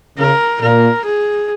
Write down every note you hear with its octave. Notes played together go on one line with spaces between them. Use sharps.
C#3 A#4
A#2 A#4
G#4